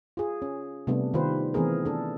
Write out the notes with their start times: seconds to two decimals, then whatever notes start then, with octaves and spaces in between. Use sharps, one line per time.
0.17 F4 G#4
0.42 C#4
0.87 C3 G3 A3 B3 D4
1.14 D#3 F4 G4 B4 C5
1.54 E3 A3 B3 C4 G#4 A#4
1.85 D4 A4